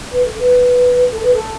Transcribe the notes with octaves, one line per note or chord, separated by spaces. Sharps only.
B4
A4
B4
A4
B4
A4